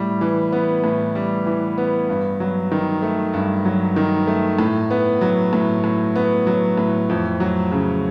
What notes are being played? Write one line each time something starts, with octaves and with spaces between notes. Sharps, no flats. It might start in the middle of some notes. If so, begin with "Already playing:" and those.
Already playing: A2 G3
E3
B3
A2
G3
E3
B3
G2
F#3
D#3
A3
G2
F#3
D#3
A3
A2
B3
F#3
A2
A2
B3
F#3
A2
F2
F#3
C#3